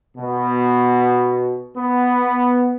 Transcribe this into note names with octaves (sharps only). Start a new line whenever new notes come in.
B2
B3